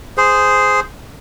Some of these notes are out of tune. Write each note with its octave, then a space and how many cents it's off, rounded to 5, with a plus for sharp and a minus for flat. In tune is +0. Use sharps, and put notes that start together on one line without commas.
G#4 +0 C5 -10